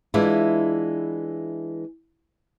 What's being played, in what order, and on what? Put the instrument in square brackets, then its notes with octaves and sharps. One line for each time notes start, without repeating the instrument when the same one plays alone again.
[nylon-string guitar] E3 G#3 D4 E4 F4